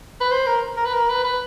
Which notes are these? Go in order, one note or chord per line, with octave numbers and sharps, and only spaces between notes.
B4
C5
A#4
A#4
B4
A#4
B4
B4